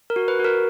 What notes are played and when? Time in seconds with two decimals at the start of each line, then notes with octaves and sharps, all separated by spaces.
0.10 A#4
0.16 F#4
0.28 B4
0.39 F#4
0.44 A#4